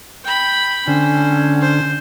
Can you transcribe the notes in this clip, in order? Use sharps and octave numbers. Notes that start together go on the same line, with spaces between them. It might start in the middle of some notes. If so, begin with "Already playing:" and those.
G5 B5
D3 C#4 C5
C5